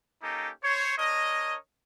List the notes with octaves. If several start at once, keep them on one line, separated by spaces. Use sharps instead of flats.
A#3 C#4 D#4 G4 A4
C5 C#5
D4 A#4 C#5 D#5